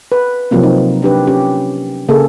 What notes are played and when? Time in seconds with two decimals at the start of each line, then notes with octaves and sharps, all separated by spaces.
0.12 B4
0.51 C3 F3 F#3 A#3 C4
0.63 D#4
1.02 D4 G4 B4
1.27 C#4 G4
2.09 C#3 A#3 G#4 A4